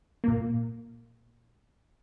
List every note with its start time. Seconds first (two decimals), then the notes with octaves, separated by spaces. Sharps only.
0.24 A#2 A#3